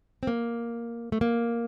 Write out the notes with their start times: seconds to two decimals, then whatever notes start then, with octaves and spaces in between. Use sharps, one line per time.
0.23 C4
0.27 A#3
1.12 A3
1.21 A#3